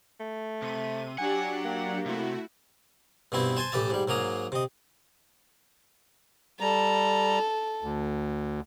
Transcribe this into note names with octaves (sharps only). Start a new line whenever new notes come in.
A3
C3 D#7
F#3 D4 G4 F#5 G#5
A#3
C3 A3 E4 F#4
G2 B2 C4 E4
C5 G#5 A5 C6
A1 E3 G4 E5 A5
G#2 G3
G#2 F#3 A#3 G#4 A#5
C3 D#5
G3 A4 A#5
D2